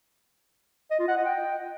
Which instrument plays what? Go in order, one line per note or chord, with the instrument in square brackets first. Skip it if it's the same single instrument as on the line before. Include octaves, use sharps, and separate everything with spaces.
[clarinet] D#5
F4
F#5
D#5
G5